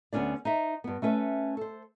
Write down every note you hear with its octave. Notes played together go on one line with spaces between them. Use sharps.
D2 B3 C#4 D4 D5
D#4 C5 E5
G2 B3
A3 C#4 B4 E5
A4 C5